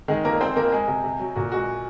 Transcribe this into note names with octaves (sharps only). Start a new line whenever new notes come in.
D#3 G#3 G#4
F2 A#3 A#4
G#3 C4 C5
F2 A#3 A#4
G#3 G#4
C3
C3
F#3
A#2 F#4
G#3 F#4